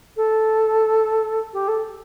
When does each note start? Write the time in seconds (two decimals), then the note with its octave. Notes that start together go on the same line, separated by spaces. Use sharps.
0.16 A4
1.53 G4
1.68 A4